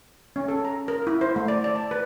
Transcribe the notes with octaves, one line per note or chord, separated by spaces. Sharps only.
C#4
A4
A#5
A#4
E4
C5
A3
D5
D5
A5
B4